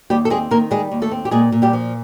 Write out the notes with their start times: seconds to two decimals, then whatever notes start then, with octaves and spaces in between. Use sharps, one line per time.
0.10 D#2 G3 G4
0.25 A4
0.30 G#3 C4 G#4
0.51 D#3 A#3 A#4
0.71 G3 G#3 G#4
0.92 D#2
1.02 A3 A4
1.12 C4
1.25 G4
1.31 A#2 G#3 G#4
1.52 A#2
1.62 G3 G4
1.73 F3